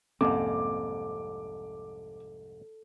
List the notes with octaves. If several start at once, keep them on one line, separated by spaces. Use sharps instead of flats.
C2 F2 G#2 A#3 C4 C#4 A4 D6